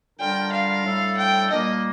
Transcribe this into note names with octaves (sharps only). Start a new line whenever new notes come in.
D3 G3 D4 F4 A#4 G5
F5
A2 G3 D4 A4
G5
A#2 G3 A#3 D#5